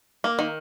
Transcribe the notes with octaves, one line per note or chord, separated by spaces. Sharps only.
A#3
D#3